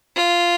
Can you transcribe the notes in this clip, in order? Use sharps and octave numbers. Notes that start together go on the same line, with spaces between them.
F4